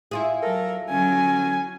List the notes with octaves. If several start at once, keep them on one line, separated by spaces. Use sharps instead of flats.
E4 F4 G#4
F#3 A4 A#4
D3 F#3 C#4 G#5